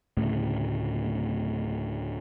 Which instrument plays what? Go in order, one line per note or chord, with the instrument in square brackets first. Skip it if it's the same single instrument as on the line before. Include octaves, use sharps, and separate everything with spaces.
[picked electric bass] D2 A2 C#3